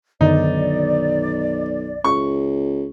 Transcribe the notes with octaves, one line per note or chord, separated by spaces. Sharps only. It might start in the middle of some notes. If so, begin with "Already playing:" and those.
B1 F#2 D3 D#3 D#4 D5
C#2 C#6